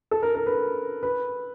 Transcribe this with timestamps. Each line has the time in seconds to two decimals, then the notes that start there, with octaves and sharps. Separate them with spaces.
0.11 A4
0.23 A#4
0.35 A#4
0.46 B4
1.03 B4